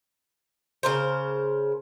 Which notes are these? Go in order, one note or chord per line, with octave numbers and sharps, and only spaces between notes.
C#3 A#4 C5